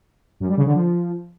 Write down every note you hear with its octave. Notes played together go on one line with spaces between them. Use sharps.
F#2
G3
C#3
D3
F3